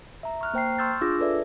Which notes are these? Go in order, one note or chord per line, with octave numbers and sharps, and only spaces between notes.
E5 A#5
C#6 F6 F#6
A#3 C5 G5 A#5 C7
C6 C#6 E6 F6 G6 A6
D4 F4 G#4 D6 E6 A#6
A4 B4 D5 E5